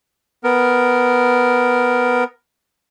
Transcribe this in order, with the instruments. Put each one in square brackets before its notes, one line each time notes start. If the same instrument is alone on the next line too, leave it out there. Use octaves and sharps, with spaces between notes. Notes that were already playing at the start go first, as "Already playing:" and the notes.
[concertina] B3 A#4